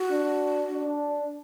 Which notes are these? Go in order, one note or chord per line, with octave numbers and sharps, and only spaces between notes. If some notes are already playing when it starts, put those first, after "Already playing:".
Already playing: F#4
D4
D4